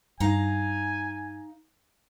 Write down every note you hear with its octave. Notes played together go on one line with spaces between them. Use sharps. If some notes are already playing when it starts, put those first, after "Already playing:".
G2 D#4 F5 G#5 A#5